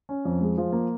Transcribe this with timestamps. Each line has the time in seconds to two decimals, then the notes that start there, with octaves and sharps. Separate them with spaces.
0.09 C#4
0.25 F2
0.41 G#3
0.58 F3
0.73 A#3